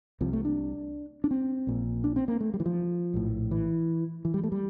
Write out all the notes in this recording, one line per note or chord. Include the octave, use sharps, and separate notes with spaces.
C2 C3 F3
A3
D4
D4
C4
A#1 A#2
D4
C4
A#3
A3
G3
E3
F3
A#1 A2
E3
E3
G3
A3
G3